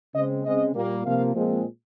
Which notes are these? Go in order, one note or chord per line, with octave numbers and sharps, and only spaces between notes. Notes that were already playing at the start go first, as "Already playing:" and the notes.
C#3 G#3 C4 D#5
C#3 G#3 C4 D#5
A#2 G3 A#3
C3 F3 A#3 F5
A#2 F3 G#3 C4